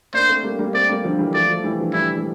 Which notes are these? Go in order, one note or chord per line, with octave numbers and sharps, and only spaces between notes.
A#3 D4 C5
A3 C4
G3 A#3
G3 A#3
A3 C4 D5
G3 A#3
D3 F3
E3 G3
F3 A3 D5
F3 A3
E3 G3
D3 F3
E3 G3 E4
G3